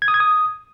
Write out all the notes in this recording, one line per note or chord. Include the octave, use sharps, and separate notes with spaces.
G#6
D#6
G#6
D#6